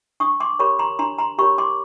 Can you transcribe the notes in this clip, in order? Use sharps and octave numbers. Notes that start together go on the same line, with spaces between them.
D4 C#6 D#6
C6 D6
G4 A#4 C#5 B5 C#6
A#5 C6
D4 A#5 C6
A#5 C6
G4 A#4 C#5 B5 C#6
C6 D6